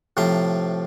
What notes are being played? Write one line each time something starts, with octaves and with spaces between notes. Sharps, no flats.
A2 C3 F3 A#5 C6